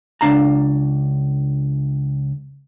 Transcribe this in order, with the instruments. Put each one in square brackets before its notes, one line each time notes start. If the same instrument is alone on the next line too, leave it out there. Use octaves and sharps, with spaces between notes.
[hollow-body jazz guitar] C#2 D4 F5 A5 A#5